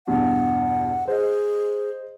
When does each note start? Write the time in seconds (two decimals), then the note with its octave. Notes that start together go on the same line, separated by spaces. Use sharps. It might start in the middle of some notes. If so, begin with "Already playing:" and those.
0.07 E2 G2 B2 F#5
1.08 G#4 C5 D#5